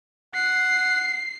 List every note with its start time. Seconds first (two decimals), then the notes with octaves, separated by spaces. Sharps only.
0.35 F#5 C7